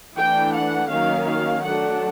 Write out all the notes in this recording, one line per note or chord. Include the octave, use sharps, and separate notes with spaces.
E3 A3 D4 G5
F#5
D#3 F#3 A#3 C#4 F5
F5
F#3 A3 D4 F#5